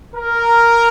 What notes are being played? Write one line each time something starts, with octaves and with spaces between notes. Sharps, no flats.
A#4